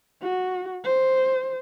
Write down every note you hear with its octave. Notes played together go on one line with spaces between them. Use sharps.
F#4
C5